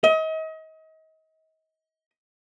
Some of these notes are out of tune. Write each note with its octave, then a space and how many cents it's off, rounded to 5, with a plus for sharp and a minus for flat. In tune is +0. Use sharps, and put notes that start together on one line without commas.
D#5 +35